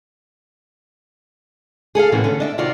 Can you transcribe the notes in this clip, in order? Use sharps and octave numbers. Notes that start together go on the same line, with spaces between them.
G#4 A4 D#5 F5
A2 C3 E3 A#3 B3 C#4
D3 C#4
D4 D#5 E5
C3 D#3 F4 F#4 D5 E5